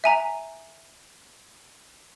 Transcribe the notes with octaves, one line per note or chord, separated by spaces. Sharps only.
E5 G#5 A#5